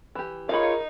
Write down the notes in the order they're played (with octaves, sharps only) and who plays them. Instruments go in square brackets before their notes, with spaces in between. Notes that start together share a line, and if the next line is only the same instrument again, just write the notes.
[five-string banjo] E3 G4
[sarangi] D#4 [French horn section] F4 G#4 C#5 [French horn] A#4 [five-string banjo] F5 B5